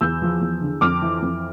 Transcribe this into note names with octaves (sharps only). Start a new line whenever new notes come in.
E2 E6 G6
F3
E2
D3
F2 D6 F6
E3
F2